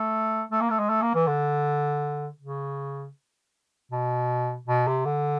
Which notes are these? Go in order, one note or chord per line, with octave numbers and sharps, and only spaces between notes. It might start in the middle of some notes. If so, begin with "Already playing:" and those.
Already playing: A3
A3
A#3
A3
G#3
A3
A#3
E3
D3
C#3
B2
B2
C3
D3